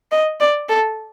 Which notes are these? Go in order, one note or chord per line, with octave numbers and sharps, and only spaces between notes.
D#5
D5
A4